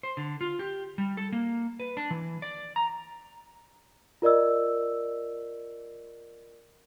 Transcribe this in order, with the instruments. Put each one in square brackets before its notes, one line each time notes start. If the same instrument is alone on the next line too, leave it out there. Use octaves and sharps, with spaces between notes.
[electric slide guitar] C5
D3
F4
G4
G3
A4
A#3
B4
D4
E3
D5
A#5
[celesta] F4 A#4 D5 D#5 E6